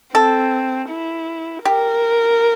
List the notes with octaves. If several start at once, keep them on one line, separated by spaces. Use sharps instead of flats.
C4 A4
E4
G4 A#4